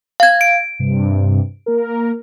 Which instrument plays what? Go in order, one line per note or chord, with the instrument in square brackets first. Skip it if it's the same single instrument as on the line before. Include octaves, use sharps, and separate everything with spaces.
[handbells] F5 G#6
D7
[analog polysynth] G2 C3
A#3 A#4